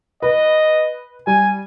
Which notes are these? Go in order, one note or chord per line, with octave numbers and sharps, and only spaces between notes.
B4 D#5
G3 G#5